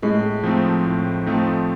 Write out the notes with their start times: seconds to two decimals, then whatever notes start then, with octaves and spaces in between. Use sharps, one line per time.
0.02 A2 G#3
0.43 F3 A3 C4 D#4
0.85 A2
1.26 F3 A3 C4 D#4